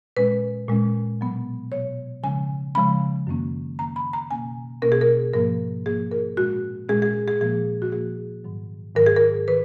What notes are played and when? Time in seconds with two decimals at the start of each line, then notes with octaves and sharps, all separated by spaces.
0.17 A#2 G#3 C#4 B4
0.69 A#2 G#3 C#4
1.20 B2 F#3 B3
1.72 B2 F#3 B3 C#5
2.23 C#3 F3 G#3 C#4 G#5
2.75 C#3 F3 G#3 C#4 B5
3.27 F#2 D#3 A#3 C#4
3.79 F#2 D#3 A#3 C#4 A#5
3.96 B5
4.13 A#5
4.30 B2 A#3 C#4 G#5
4.82 B2 A#3 C#4 A#4
4.92 G#4
5.01 A#4
5.34 G#2 F3 A#3 A#4
5.86 G#2 F3 A#3 G#4
6.11 A#4
6.37 A#2 G#3 C#4 F#4
6.89 A#2 G#3 C#4 G#4
7.02 G#4
7.28 G#4
7.41 A#2 F3 A#3 G#4
7.82 F#4
7.92 A#2 F3 A#3 G#4
8.44 G#2 D#3 F#3
8.96 G#2 D#3 F#3 A#4
9.06 G#4
9.16 A#4
9.48 D#3 B4